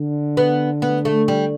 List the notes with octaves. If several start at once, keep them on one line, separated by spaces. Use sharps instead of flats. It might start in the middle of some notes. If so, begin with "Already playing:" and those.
Already playing: D3
B3
B3
A3
G3